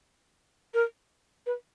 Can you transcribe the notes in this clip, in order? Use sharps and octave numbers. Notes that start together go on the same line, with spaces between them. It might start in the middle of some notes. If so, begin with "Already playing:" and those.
A#4
B4